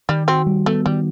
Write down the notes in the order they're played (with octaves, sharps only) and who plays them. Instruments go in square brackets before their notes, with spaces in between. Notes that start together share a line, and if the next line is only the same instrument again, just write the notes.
[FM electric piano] D#3 [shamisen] G3
[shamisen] C4 [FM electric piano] F#4
[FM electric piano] G3
[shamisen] A3 [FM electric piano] B3
[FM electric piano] D#3 [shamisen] G3